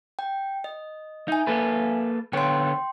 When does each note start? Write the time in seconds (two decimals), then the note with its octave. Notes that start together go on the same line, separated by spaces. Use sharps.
0.19 G5
0.64 D#5
1.28 D#4 E5 G#5
1.47 A#3 A4 B4
2.33 D3 B3 C#5 G5 C6